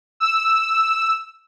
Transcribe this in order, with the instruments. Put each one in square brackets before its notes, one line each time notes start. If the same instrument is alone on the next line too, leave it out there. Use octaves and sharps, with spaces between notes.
[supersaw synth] E6